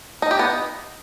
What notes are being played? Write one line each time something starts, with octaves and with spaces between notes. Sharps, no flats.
D#4
G4
B3
D#4